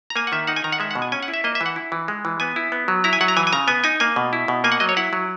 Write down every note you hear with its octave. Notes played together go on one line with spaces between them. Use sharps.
A#5
A#3 G#5
F#5
D#3 E5
D#4 F#5
G#5
D#3 A#5
F#5
G#3 E5
F#5
B2
G#5
C#4 G#5
F#5
E4
E5
A#3 D#5
E5
E3
F#5
E4
E3
G#3
E3
B3 G#5
E4
B3
F#3
E4 A#5
G#5
F#3 F#5
A#5
E3 G#5
G#5
C#3 A#5
B3 G#5
D#4 G#5
A#3 G#5
B2
E4
B2
A#3 G#5
F#5
F#3 D#5
C#5
E4 F#5
F#3